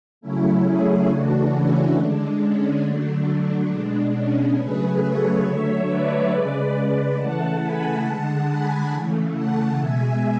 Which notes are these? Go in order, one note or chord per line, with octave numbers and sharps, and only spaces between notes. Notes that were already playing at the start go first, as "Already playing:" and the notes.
C#3 F#3 A3 C#4 E4
E4 G#4
C#3 E3 A3 D4 F#4
C#4 E4
D3 G#3 D4
C#4
D3 F#3 A3 D4
B2 G#3 D4
C#4
C#3 F#3 A3 G#4 B4
A4 C#5
D3 F#3 A3 C#5 E5
B4 D5
C#3 G#3 B4 D5
B4 D5
C#3 E3 A3 F#5 A5
G#5 B5
D3 G#3 F#5 A5
G#5 B5
C#3 E3 A3
F#5 A5
B2 G#3 E5 G#5